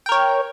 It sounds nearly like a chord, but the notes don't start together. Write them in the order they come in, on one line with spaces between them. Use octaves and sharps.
G5 A#4 C#5